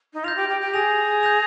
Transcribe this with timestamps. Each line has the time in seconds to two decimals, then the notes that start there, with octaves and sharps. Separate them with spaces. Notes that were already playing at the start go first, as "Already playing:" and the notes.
0.13 D#4
0.24 F4 G6 A#6 F7
0.36 G4
0.49 G4
0.61 G4
0.74 G#4 G6 A#6 F7
1.23 G6 A#6 F7